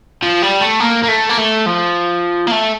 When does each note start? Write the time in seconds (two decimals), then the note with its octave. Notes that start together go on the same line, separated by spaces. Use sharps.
0.23 F3
0.42 G3
0.61 A3
0.80 A#3
1.03 A#3
1.08 A3
1.30 A#3
1.38 A3
1.66 F3
2.47 A#3
2.52 A3